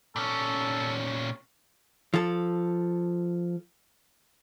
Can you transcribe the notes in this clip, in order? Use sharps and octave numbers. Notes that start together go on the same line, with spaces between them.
A#2 C#4 A4
F3 A4